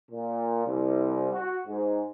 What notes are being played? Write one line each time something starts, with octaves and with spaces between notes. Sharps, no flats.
A#2
C2
F#4
G#2